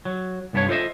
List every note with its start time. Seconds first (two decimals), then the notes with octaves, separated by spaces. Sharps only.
0.05 F#3
0.53 C2 G2 B3 D4 C#5
0.69 F4 A4 C5 C#5 D#5 E5